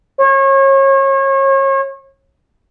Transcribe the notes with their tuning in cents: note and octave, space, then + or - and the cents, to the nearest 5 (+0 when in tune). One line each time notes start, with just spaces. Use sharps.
C#5 -35